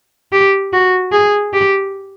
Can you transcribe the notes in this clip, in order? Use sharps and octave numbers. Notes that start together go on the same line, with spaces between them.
G4
F#4
G#4
G4